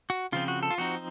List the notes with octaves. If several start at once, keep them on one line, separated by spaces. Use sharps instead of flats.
F#4
C#3 F3 C4 F4
F#4
A4
F4
F3 C4 D#4 F#4